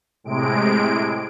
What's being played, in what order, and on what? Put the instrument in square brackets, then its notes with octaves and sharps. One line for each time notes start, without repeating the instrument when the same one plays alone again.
[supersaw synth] A2 C3 G#3 D7